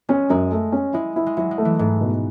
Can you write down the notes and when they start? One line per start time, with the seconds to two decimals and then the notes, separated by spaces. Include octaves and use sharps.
0.09 G#3 C#4
0.30 F#2 G#3
0.52 A3
0.72 C#4
0.94 G#3 E4
1.16 E4
1.26 G#3
1.37 F#3 E4
1.51 G#3
1.58 A3
1.65 E3
1.79 G#2 A3
2.01 B2